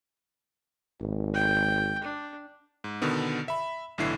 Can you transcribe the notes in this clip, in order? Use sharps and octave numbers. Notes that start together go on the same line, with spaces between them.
G#1
G5
D4
G#2
B2 D3 D#3 B3
E5 B5
B1 A2 D3 E3 E4 C7